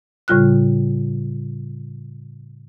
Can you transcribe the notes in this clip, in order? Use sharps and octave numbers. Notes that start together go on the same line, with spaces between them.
A2 C#3 G3 F4 F6 F#6